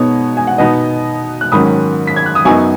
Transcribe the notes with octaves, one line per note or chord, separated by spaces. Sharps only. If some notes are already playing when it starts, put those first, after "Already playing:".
Already playing: B2 G#3 B3 D#4 C#5
G#5
F#5
B2 B3 D#4 D#5
F#6
G#2 D#3 F#3 C#4 B5 D#6
B6
G#6
F#6
D#6
F#2 F#3 B3 D#4 G#5 C#6